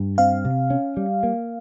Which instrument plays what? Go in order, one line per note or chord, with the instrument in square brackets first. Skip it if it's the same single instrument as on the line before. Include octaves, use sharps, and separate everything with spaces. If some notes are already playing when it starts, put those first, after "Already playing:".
Already playing: [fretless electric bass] G2
[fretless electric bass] C4 [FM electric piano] F5
[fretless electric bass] C3
C#4
G3
A#3